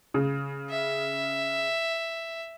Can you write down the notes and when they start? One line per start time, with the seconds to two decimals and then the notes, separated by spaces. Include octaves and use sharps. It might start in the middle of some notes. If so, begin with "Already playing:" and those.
0.14 C#3
0.70 E5